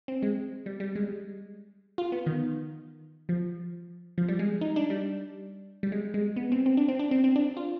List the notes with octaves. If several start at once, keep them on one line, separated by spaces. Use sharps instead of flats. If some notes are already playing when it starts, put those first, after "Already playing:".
C4
G#3
G3
G3
G#3
F4
B3
D#3
F3
F3
G3
G#3
D#4
D4
G3
G3
G#3
G#3
B3
C4
C4
D4
C4
D4
C4
C4
D4
F4